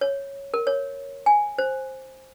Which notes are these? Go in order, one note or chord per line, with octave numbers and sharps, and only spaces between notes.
C#5
A#4
C#5
G#5
C5